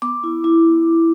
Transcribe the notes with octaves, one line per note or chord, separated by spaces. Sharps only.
B3 D6
E4
E4